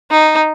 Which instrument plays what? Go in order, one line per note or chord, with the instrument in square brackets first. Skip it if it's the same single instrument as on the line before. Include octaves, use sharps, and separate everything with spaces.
[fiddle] D#4